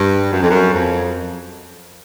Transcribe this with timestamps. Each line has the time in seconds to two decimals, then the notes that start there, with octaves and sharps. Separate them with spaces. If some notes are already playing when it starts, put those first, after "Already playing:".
Already playing: G2
0.32 F#2
0.42 F2
0.51 F#2
0.74 F2